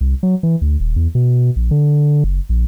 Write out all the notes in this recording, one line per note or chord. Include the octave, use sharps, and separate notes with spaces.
C2
F#3
E3
D2
D#1
E2
B2
A#1
D3
F#1
A#1